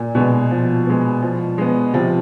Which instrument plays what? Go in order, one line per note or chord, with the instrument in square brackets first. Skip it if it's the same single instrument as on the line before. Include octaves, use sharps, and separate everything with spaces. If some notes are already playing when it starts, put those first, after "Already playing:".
Already playing: [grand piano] A#2
[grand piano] B2 [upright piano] G#3 B3
[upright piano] F3
G#3 B3
F3
G#3 B3
[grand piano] C3 [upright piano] F3